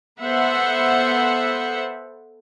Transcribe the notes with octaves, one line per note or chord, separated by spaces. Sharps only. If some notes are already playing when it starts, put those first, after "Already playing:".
B3 A4 C5 E5 F#5